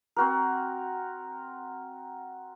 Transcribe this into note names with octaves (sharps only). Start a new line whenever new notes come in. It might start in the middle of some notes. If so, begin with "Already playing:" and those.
C4 F#4 A#4